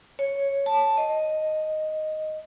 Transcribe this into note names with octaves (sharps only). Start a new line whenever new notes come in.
C#5
A5
D#5